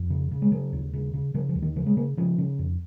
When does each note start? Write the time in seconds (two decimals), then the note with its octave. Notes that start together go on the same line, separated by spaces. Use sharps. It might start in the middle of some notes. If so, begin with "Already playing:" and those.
Already playing: F2
0.10 C#3
0.31 C#3
0.42 G#3
0.51 C#3 F#3
0.72 D#2
0.93 C#3
1.14 C#3
1.34 C#3 F#3
1.49 F3
1.55 D#2
1.62 D#3
1.76 C#3 F3
1.86 G#3
1.97 C#3 A#3
2.17 C#3 F3
2.38 C#3
2.59 F2